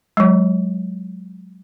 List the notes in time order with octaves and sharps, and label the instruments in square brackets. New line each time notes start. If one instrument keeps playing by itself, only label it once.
[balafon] F#3 G#3